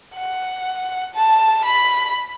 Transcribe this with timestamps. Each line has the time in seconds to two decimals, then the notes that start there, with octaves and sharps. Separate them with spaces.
0.14 F#5
1.15 A5
1.65 B5